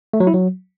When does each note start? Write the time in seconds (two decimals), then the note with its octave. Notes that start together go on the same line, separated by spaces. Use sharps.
0.13 A3
0.20 F#3
0.27 E4
0.34 F#3